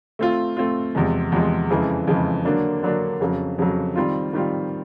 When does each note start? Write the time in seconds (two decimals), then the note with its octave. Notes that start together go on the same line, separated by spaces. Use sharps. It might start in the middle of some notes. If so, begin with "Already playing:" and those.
0.19 A3 C4 F4
0.57 A3 C4 F4
0.95 E2 C3 F3 G#3
1.32 E2 C3 F3 G#3
1.70 F2 C#3 E3 G#3
2.07 F2 C#3 E3 G#3
2.45 D3 F#3 A#3 D4
2.83 D3 F#3 A#3 D4
3.21 F2 C#3 F#3
3.58 F2 C#3 F#3
3.95 D#3 G3 C4 F4
4.33 D#3 G3 C4 F4